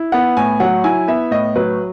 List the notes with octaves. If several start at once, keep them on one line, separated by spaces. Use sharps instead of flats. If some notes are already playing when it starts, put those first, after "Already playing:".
Already playing: E4
B3 F#5
A2 G#5
F#3 F#5
E4 G#5
B3 E5
A2 D#5
F#3 B4